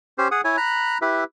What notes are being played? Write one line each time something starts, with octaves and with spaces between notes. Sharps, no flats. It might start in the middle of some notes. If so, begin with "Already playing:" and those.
C#4 G4 C5
G#4 F#5 D#6
E4 C#5 G#5
A#5 B5 F#6
E4 G4 B4 E5